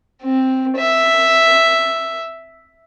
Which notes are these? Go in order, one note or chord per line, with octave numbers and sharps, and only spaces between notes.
C4
E5